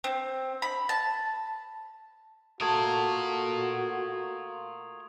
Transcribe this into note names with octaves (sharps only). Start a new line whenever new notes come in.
C4
B5
A5
A3 F4 F#4 A#4 D#6 G#6 F#7